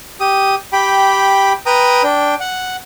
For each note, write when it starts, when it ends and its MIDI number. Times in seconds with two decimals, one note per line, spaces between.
0.20 0.55 67
0.20 0.55 87
0.73 1.53 67
0.73 1.53 79
0.73 1.53 83
1.66 2.03 71
1.66 2.03 79
1.66 2.03 82
1.66 2.03 87
2.03 2.35 62
2.03 2.35 79
2.40 2.76 78